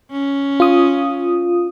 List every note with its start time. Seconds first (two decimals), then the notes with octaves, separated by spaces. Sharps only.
0.12 C#4
0.60 F4 D#6